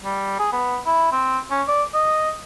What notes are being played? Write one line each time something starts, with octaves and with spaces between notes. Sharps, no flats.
G3
G#4
B3
E4
C4
C#4
D5
D#5